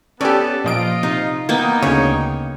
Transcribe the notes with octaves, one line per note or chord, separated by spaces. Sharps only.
B3 C#4 G4 A4 D5
A#2 F3 F4 D#5 D7
C3 D#4
A#3 B3 D#4 G5
D2 C#3 C#5